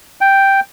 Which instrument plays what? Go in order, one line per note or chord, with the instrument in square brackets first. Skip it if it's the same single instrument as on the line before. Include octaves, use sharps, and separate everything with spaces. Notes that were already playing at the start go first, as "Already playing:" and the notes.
[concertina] G5